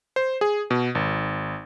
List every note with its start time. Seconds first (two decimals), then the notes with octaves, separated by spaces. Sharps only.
0.16 C5
0.41 G#4
0.71 B2
0.95 G#1